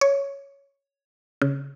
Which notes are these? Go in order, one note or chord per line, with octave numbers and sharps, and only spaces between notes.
C#5
C#3